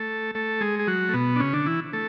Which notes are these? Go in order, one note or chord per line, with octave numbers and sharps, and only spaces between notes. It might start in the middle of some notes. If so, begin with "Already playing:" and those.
Already playing: A3 A4
A3 A4
G#3 G#4
G#4
F#3 F#4
A3
B2 B3
D4
C#3 C#4
D3 D4
E3 E4
A3 A4